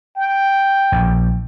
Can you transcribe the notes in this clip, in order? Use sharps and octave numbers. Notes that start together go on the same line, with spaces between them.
G5
A#1